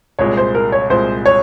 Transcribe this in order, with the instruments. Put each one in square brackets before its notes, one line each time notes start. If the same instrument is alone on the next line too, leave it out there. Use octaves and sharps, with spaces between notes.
[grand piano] C2 A#2 G#3 [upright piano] C#5
[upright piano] C5
A#4
C#5
[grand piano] C2 A#2 G#3 [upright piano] C5
[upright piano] C#5